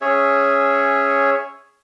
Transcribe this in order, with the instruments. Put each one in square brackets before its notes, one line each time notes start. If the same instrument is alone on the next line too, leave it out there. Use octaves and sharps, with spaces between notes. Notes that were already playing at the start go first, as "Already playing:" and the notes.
[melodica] C#4 G#4 C#5 E5